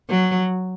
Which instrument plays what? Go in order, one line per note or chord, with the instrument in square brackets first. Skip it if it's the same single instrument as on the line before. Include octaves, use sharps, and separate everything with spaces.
[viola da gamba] F#3